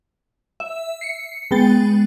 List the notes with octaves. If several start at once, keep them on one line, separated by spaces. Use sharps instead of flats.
E5
C7 C#7
G#3 B3 G5 A6